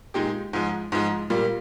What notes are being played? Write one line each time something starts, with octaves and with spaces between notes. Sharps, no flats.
A#2 G#3 D#4 G4
G#2 F3 G#3
G#2 F3 G#3
A#2 G3 A#3